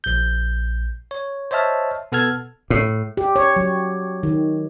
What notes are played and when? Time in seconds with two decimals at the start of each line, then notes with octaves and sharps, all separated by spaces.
0.04 A#1 G6
1.11 C#5
1.51 C5 C#5 D#5 E5 A5 F6
2.12 B2 B3 A4 A5 F6 G#6
2.70 A2
3.17 G4
3.36 C#5
3.56 F#3
4.23 D#3